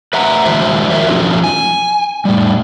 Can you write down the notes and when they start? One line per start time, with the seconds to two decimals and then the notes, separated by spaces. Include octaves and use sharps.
0.13 B4 E5 F#5 A#5
0.45 D#3 G#3 E4 F#4 C5 E5
0.90 F#4 A#4 C#5 E5
1.09 F3 F#3 A3 C#4 D#4 F4
1.44 G#5
2.25 A2 G3